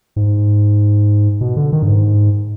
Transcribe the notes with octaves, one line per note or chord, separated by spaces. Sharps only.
G#2
B2
D3
D#3
G2
G#2